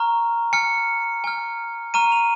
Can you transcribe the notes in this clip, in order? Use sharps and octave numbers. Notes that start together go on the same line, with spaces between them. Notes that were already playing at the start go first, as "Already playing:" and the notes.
Already playing: A#5 C#6 F6
G#5 F6 C#7
G#5 F6
A#5 C#6 F6 D#7
F7